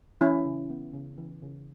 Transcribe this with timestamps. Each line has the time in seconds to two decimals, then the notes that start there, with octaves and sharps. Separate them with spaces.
0.21 E3 C#4 E4
0.45 C#3
0.70 B3
0.93 C#3
1.18 E3
1.42 C#3